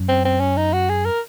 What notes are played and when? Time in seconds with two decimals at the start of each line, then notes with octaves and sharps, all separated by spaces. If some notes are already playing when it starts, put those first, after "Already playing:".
Already playing: F#2
0.09 C4
0.25 C4
0.40 C#4
0.57 D#4
0.74 F#4
0.89 G#4
1.05 A#4